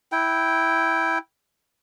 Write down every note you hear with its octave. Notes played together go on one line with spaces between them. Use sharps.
E4 G5